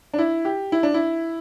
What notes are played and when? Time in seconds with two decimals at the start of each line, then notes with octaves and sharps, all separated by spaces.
0.14 D4
0.18 E4
0.45 G4
0.72 E4
0.83 D4
0.94 E4